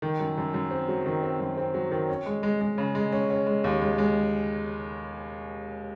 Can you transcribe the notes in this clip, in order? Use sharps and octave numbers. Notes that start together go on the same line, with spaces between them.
D#3
F#2
F#2
F#2
C4
F#3
D#3
C4
F#2
C4
F#3
D#3
C#4
G#3
G#3
G#3
C#3
G#3
C#4
C#4
G#3
D#2
G#3
G#3